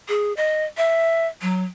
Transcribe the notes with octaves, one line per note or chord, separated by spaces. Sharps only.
G#4
D#5
E5
F#3